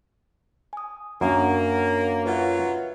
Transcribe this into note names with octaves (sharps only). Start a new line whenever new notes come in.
G#5 D#6
F#2 A#3 D4 F#5 A#5
F#3 C#4 F4 B4 E5 F#5